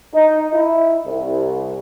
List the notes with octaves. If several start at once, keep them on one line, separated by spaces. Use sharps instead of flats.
D#4
E4
C2